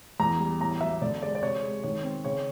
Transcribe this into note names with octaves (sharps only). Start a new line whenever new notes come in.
E2 A#5
G3
A2 A#5
B1 E5
D3 D5
G#3 D5
D5
C3 C#5
G#3
D#3 C#5
C4
C#3 C#5